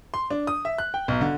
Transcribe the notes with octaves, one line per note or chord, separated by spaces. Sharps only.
C6
D4
D#6
E5
F#6
G5
B1
D3